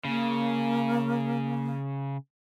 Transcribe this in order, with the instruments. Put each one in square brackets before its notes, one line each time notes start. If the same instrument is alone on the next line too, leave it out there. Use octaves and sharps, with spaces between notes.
[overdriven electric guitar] C#3 [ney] A#3